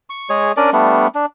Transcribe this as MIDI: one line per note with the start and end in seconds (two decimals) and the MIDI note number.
0.10 0.29 85
0.30 0.52 56
0.30 0.52 68
0.30 0.52 73
0.57 0.71 61
0.57 0.71 62
0.57 0.71 70
0.57 0.71 74
0.73 1.07 55
0.73 1.07 57
0.73 1.07 59
0.73 1.07 62
1.15 1.26 62